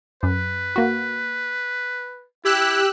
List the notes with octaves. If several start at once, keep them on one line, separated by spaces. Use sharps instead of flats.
F#2 B4
A#3 F#4
E4 G4 E6 F#6